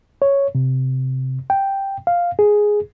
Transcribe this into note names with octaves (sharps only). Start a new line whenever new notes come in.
C#5
C3
G5
F5
G#4